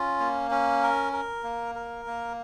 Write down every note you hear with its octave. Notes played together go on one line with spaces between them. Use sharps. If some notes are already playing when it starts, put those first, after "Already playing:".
Already playing: C#4 F4
A#3
C#4
A#4
A#4
A#3
A#4
A#3